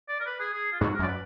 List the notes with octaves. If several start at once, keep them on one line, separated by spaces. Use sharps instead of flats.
D5
A#4
B4
G#4
G#4
F4
G#2 F#4
A#4
F#2
D5
B4